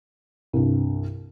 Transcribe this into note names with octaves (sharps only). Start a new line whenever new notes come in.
C2 G2